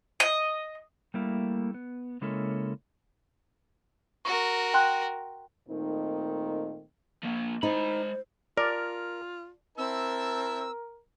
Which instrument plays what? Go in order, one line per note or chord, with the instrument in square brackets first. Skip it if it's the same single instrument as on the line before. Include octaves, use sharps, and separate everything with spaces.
[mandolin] D#5
[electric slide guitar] G3 A3 A#3 E4
B3
C#3 G#3 A#3 C#4 E4 A4
[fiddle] F#4 A#4 [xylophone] C#6
[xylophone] G5 C6 F#6
[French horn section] A#2 D#3 A3 C4 D#4
[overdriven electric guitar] F3 A#3
[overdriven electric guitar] G#3 B5 [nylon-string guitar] D#4 [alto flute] C5
[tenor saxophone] F4 [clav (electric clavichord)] A#4 [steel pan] D5
[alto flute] C4 [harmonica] E4 E5 A5 [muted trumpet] A#4 [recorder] E6